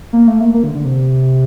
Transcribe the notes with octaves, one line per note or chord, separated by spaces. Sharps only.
A#3
A3
A#3
A#3
D3
D3
C3